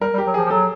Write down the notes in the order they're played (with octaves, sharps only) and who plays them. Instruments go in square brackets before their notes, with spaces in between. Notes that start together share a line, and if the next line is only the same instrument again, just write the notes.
[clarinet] G3 [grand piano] A#4
[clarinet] G3
[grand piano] G4
[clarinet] F#3
[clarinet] F3 [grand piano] G#4
[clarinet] F3
[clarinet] F#3 [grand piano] A4